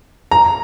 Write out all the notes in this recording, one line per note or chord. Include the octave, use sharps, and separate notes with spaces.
A#5